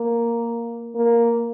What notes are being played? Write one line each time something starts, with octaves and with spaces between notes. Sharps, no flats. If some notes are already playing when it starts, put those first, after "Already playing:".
Already playing: A#3
A#3